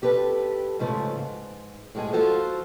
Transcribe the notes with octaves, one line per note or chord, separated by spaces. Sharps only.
F2 G4 A4 B4
G#2 C#3 F3 G3 A3
G#2
A2 F3 G#3 G4 G#4
F3 F4 F#4 A4 C5